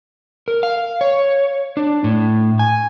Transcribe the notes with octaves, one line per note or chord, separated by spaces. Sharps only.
A#4
F5
C#5
D4
A2
G#5